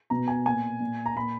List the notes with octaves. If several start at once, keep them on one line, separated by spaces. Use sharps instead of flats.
B2 A#5
G#5
A#2 G#5
A#2
A#5
A#2 B5